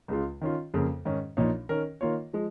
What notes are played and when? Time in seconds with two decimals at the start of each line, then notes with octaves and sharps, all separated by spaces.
0.08 C#2 C#3 G#3 F4
0.41 D#3 C#4 F4
0.74 F2 C#3 A#3
1.05 G#2 D#3 C#4
1.37 A#1 A#2 A#3 D#4 C#5
1.69 D#3 C#4 A#4
2.01 D#3 A#3 F4 C#5
2.33 F3 G#3